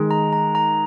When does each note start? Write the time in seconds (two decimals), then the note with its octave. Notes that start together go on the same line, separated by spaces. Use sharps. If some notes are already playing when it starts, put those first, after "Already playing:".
Already playing: D#3 G#3 D#4
0.11 A#5
0.33 A#5
0.55 A#5